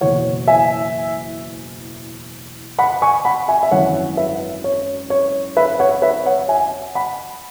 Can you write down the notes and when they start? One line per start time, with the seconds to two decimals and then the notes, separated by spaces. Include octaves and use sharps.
0.01 F#1 E2 B2 C#5 F#5
0.47 E5 G#5
2.79 F#5 B5
3.02 G#5 C#6
3.25 F#5 B5
3.48 E5 G#5
3.63 E5
3.71 G#1 F#2 E3 C#5 F#5
4.17 B4 E5
4.64 C#5
5.10 C#5
5.57 B4 E5
5.79 C#5 F#5
6.02 B4 E5
6.26 C#5 F#5
6.48 E5 G#5
6.95 F#5 B5